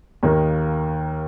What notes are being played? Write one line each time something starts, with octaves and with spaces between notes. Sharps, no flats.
D#2 D#3 A#3 D#4 A#4